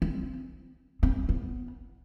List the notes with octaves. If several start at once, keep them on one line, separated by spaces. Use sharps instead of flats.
C4
C4
B3